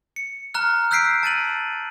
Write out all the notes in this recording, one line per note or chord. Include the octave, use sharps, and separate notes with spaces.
C#7
A#5 F6 F#6
E6 F#6 G6 B6 C7 D7
A5 A6 D#7 F#7